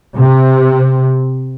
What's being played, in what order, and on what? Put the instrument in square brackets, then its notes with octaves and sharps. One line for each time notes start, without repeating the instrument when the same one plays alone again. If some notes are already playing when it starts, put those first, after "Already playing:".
[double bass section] C3